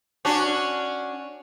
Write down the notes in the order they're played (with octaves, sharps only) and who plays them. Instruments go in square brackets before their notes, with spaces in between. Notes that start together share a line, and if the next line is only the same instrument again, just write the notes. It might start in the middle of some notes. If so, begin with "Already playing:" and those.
[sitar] C#4 D4 F#4